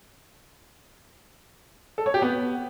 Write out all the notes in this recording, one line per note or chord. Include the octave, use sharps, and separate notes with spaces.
A4
C#5
G4
B3